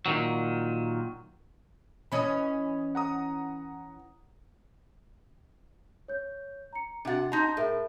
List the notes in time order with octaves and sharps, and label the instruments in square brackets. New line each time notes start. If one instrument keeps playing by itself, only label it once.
[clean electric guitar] A#2 D#3 F#3
[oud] E3 C#4 D#5 [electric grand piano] B5 D#6
[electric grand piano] F#5 A#5 D#6
[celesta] C#5 G6
A#5 C#7
[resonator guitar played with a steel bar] C3 F#5 [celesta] D4 F#4 A6
[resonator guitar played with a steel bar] D#4 A#5 [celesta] A5 C6 A#6
[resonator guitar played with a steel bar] A2 [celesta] G#4 A#4 E5